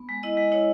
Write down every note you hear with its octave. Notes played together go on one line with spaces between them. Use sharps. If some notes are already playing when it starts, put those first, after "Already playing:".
Already playing: B3
G#3
E4 D#5
G#3
E4 C#5